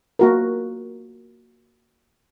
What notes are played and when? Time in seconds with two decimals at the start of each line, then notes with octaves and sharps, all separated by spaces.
0.19 A#3 F#4 A#4